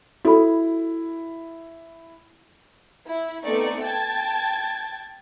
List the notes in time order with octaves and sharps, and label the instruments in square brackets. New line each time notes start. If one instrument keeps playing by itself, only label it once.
[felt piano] E4 [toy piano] F#4 A4 B5
[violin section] E4
A3 B3 C4 D#4 D5 C#6
G5 A5 G#6 A6